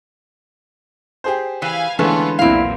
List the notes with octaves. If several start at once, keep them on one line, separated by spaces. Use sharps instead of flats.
G4 G#4 C5
E3 F5 G#5 B5
D3 E3 G#3 A3 B3 C#4 F4
B1 E2 A#2 C4 E4 F5